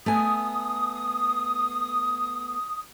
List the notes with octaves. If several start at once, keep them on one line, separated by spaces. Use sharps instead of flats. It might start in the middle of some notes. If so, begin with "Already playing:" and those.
A3 B3 G#5 D#6